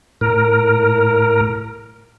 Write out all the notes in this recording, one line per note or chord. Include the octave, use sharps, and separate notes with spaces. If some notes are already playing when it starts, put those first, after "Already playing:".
A2 A#4